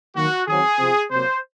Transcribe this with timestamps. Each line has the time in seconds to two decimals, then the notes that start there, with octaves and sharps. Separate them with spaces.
0.15 D#3 F#3 A#3 F#4
0.47 D#3 F#3 C4 G#4
0.79 C3 F3 C4
1.10 C3 F#3 A#3 C5